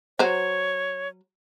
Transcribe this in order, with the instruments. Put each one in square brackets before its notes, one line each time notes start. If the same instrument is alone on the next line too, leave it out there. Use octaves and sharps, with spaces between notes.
[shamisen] F#3 C5 [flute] C#5